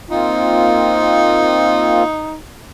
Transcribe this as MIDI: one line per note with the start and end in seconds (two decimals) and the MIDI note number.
0.09 2.03 58
0.09 2.03 60
0.09 2.37 63
0.09 2.03 65